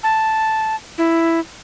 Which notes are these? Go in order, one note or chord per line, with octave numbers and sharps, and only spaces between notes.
A5
E4